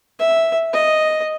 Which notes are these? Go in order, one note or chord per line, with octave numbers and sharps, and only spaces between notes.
E5
D#5